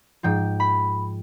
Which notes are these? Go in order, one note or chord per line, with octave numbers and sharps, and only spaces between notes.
G#2 F3 G5
B5